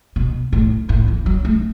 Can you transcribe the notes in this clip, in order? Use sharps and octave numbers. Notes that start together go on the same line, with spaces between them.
B2
A2
A2
E3
F#3
A3